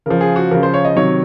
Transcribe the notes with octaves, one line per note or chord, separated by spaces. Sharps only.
C#3 F3 A#4
G#4
F#4
C#3 F3 A#4
C5
C#5
D#5
C3 D#3 F#3 C#5